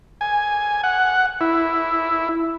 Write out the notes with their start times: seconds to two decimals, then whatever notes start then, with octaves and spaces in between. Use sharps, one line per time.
0.21 G#5
0.84 F#5
1.41 E4